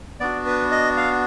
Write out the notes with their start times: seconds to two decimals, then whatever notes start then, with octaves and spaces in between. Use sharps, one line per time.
0.20 B3 D4 F#4 D5
0.46 B4
0.71 D#5
0.97 F5